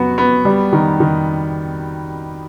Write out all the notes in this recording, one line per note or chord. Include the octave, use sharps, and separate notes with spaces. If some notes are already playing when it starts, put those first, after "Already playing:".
Already playing: F#3 B3 F#4
B3
G3
D#3
D#3